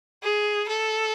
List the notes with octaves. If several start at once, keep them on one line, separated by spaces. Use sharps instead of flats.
G#4
A4